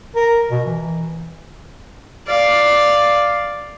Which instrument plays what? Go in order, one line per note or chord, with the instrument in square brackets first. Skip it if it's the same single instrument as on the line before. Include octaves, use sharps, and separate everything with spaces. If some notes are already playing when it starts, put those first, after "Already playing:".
[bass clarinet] A#4
B2
E3
[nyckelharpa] D5 F5